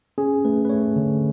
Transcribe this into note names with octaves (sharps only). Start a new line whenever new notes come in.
C#4 G#4
A3 B4
B4
A3 C#5
D3